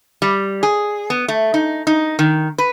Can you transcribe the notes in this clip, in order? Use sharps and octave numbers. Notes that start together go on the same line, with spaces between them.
G3
G#4
B3
A3
D#4
D#4
D#3
B4